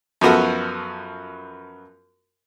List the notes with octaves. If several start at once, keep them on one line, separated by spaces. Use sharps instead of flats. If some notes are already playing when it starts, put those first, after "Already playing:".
F#2 F3 B3 F#4 A4